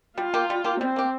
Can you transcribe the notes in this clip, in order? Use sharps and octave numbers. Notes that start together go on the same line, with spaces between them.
G3 F4
A#3 G4
G3
A#3 G4
G3 C4
A#3 G4